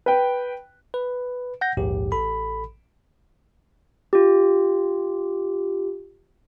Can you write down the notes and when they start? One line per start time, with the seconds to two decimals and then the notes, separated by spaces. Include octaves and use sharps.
0.06 B4 G5
0.94 B4
1.61 F#5 G6 A#6
1.77 A#1 D#2 G#2 G4
2.12 A1 A4 B5
4.13 F4 G4